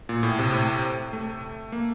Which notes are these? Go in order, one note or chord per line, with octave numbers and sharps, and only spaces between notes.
A#2
A2
C3
A2
A3
A#3